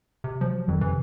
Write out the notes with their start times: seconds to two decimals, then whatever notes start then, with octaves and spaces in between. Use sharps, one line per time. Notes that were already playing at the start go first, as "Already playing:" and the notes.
0.24 C3
0.41 F3 F#3
0.68 F2 D#3
0.81 C3 E3